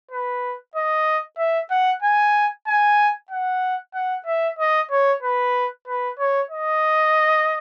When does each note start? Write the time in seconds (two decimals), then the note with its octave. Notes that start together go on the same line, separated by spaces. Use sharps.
0.11 B4
0.75 D#5
1.38 E5
1.70 F#5
2.02 G#5
2.67 G#5
3.31 F#5
3.94 F#5
4.26 E5
4.59 D#5
4.91 C#5
5.22 B4
5.88 B4
6.19 C#5
6.50 D#5